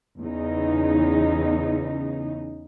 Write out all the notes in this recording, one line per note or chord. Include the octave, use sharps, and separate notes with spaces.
E2 C#3 D#4